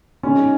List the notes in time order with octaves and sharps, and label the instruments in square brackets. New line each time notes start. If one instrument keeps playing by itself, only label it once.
[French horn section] A#2 G#3 D#4 G#4 [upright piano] C#4